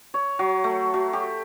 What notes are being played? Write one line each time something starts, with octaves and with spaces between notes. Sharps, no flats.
C#5
F#3
A3
F#3
G4